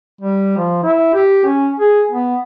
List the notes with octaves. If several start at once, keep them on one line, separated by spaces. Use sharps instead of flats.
G3
F3
E4
G4
C#4
G#4
B3